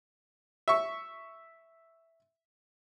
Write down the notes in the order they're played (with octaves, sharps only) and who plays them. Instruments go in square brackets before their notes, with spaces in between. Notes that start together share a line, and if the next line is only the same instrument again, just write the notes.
[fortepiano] E5 C#6